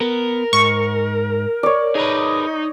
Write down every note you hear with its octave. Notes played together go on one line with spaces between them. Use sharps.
B3 A#4
G#2 C#6
C#5 D5
D#4 G#4 A#4 B4